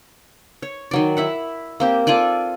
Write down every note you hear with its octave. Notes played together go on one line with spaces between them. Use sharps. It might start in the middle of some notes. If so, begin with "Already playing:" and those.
C#5
D#3 F#3 D5
E4 E5 F#5
A#3 C4 G4
F4 A4 D5 G#5